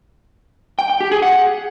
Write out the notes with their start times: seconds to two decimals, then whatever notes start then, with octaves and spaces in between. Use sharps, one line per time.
0.79 G5
0.90 G5
1.00 G4
1.11 G#4
1.22 F#5